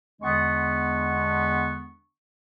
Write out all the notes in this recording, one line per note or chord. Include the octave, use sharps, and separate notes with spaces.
E2 D3 G#3 B3 D4 C#6